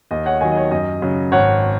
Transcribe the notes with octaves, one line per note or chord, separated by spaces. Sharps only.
D#2 D#5
C#5 F#5
D#3 F#3 D#5 G#5
D#5
C#5
F#2 D#5
C#3 F#3
G#1 C#5 F#5